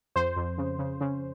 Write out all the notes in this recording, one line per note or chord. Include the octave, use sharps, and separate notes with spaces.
F2 C5
F2
C#3
C#3
C#3